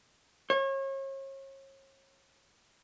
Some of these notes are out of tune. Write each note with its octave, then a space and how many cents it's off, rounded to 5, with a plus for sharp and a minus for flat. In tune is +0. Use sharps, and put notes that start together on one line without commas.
C#5 -35